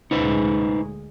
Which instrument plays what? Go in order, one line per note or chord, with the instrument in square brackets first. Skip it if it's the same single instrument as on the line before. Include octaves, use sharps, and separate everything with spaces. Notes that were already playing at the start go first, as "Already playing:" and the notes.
[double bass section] D2 A#2 G#3 [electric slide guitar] D#4 B4 C5